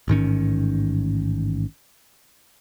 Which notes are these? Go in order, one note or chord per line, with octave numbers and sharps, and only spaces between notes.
A1 G#2 D#3 C#4